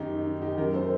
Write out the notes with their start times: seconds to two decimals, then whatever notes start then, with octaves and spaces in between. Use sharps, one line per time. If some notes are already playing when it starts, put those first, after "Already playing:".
Already playing: F#2 D#3 D#4 G4
0.26 D#4
0.42 D#4 G4
0.58 F#2 D#3 G4 A#4
0.74 A4 C5